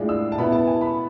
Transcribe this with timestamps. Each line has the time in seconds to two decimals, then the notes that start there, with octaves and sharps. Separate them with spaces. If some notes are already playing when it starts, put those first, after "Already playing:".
Already playing: A2 G#3 D4 F4
0.09 E6
0.32 A5
0.38 B2 B3 E4 B5
0.52 A5
0.67 G#5
0.81 B5